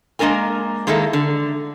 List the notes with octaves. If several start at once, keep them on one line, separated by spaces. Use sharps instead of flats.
G#3 A#3 D4 A#4 G#5
D#3 G#3 A#3 E4 A4
D3